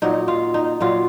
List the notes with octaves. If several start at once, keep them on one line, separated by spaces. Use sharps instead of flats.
A#2 F#3 D#4
F4
D#4
A#2 F#3 F4